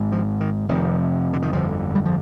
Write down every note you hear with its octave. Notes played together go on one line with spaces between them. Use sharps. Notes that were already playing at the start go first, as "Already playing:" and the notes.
Already playing: G#1 G#2
F3
D#3
F1 F2 C3 D#3
D3
D#3
G1 F2 D3 F3
G3
F3